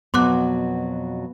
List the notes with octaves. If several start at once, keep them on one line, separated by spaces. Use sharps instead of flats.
F2 B2 F#3 B3 C6 D6 F#6